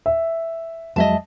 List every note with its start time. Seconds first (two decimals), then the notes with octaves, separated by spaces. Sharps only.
0.06 E5
0.96 F2 F#3 G#3 D#5 E5 A5